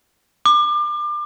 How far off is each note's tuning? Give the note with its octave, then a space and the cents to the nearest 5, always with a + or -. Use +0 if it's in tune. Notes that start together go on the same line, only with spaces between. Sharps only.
D6 +30